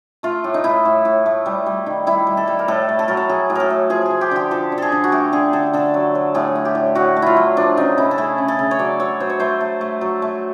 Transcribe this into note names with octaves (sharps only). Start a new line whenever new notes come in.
A3 F4
A2
D#4
A3 E4
A2
A2
A3
G3
G3
D#3
G3 E4
G3
A4
G3
A#4
A2 A4
A3
A4
F#3 A#4
A4
F#3 G#4
A2
A4 A#4
A2
F3 G#4
F3 G#4
G4
D3 G4
F3 A4
D3
G#4 A4
D3
F#4
A3 G4
D3 G#4
D3 A4
D3 A4
F#3
F#3
A2 G#4
A2
G4
A2
A2 F#4
A3
E4 F4
F#3
F3 D4
C#3 D#4
C#3 E4
A4
A3 G#4
C#3
A4
C#3
C#5
F#3 D5
F#3 C#5
F#3 C5
C#5
A3 C5
A3
A3
F#3
A3